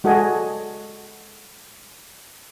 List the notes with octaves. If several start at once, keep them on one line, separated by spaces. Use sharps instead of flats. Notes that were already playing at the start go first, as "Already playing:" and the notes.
G#3 F#4 A4 D5 D#5 G#5